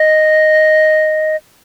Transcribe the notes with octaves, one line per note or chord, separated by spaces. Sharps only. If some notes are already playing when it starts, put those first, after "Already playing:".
Already playing: D#5